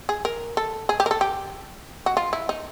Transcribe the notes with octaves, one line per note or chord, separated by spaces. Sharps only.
G#4
A#4
A4
G#4
G4
A#4
A4
G4
F#4
F4
E4
D#4